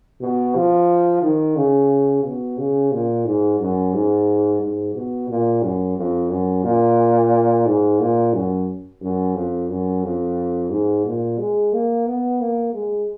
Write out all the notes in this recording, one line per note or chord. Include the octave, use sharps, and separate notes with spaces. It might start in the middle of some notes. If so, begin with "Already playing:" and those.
B2
F3
D#3
C#3
B2
C#3
A#2
G#2
F#2
G#2
G#2
B2
A#2
F#2
F2
F#2
A#2
G#2
A#2
F#2
F#2
F2
F#2
F2
G#2
A#2
G#3
A#3
B3
A#3
G#3